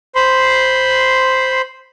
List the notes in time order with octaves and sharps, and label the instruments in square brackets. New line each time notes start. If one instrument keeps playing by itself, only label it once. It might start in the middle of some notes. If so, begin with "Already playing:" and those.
[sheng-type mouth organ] C5 B5 C6